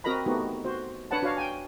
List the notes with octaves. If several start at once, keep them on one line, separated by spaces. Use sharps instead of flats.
C4 F#4 A#4 D#5 A#5 B5
A3 B3 D#4 F#4 G4
F#4 C5
D4 B4 C#5 F#5 A5
D4 F#4 C#5 F5
G5 G#5